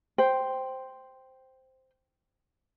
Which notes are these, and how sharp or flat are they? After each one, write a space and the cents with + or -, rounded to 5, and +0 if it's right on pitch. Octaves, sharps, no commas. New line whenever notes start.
C5 +0 G5 +0